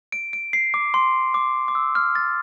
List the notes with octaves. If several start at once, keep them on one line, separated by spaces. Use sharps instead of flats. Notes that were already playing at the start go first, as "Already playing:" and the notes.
D7
D7
C7
D6
C6
D6
D6
E6
F6
A6